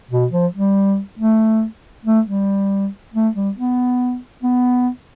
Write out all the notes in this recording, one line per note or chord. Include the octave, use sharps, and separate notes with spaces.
B2
F3
G3
A3
A3
G3
A3
G3
B3
B3